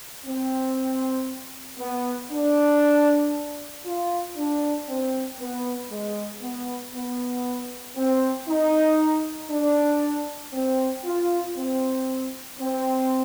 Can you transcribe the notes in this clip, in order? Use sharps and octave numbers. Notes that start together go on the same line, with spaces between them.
C4
B3
D4
F4
D4
C4
B3
G#3
B3
B3
C4
D#4
D4
C4
F4
C4
C4